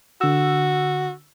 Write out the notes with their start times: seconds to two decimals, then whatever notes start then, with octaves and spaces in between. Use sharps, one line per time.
0.21 D3 F#4 E6